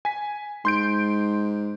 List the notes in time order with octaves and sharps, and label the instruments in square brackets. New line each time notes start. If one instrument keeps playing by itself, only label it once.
[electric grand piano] G#5 B6
[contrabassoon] G#2 [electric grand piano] C6 G6 D7